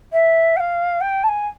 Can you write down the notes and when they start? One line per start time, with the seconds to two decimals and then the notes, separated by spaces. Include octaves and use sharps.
0.12 E5
0.56 G5
0.59 F5
1.00 G5
1.23 A5
1.28 G#5